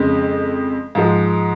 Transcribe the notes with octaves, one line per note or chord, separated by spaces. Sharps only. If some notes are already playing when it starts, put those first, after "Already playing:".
Already playing: F2 C#3 G#3
G#2 F3 G#3